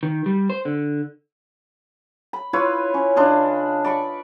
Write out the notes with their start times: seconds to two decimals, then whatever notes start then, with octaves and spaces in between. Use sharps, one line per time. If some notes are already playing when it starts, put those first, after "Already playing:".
0.03 D#3
0.26 G3
0.50 C5
0.65 D3
2.33 B5
2.53 E4 F4 B4 C#5
2.94 C#4
3.16 C#3 D4 F4 D#5
3.84 D5 B5 C#6